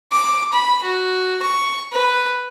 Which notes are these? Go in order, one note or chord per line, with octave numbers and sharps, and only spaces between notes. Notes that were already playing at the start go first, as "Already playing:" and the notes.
D6
B5
F#4
C#6
B4